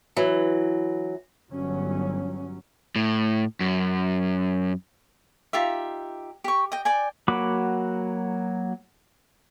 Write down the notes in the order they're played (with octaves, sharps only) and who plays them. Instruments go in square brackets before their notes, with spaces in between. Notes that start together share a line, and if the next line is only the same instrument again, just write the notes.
[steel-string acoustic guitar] E3 F#3
[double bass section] G1 F#3 C#4
[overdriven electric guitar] A2
F#2
[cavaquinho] D#4 F4 G4 E5
G4 C#6
D#5 G5
D5 G5 G#5
[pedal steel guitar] F#3 A#3 F#4 B5 D6